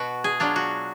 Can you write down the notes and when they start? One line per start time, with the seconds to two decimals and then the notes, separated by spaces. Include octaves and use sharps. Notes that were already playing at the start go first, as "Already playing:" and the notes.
Already playing: B2 F#4
0.24 G#4
0.40 F#3 D4 F4
0.56 F#4